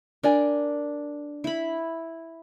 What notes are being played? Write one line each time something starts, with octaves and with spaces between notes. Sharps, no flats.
D4 A#4 D5 G#5
E4 B5